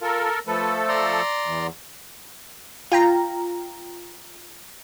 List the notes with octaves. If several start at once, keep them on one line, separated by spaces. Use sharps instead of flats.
F4 A4 A#4
F3 A3 A4 B4
D5 A#5 C6
E2
F4 G5 A#5